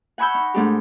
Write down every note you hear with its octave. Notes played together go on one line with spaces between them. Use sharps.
F#5 G#5 B5 C#6 E6 G6
D#4
G#2 A3 D4 G4